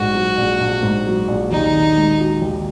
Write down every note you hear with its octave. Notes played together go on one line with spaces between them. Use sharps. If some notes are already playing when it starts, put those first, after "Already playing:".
Already playing: A#1 G#2 F#4
F#3
A#1
A#1
G#2
F#3
A#1
D#2 D#4
D#3
G#3
F#4
D#2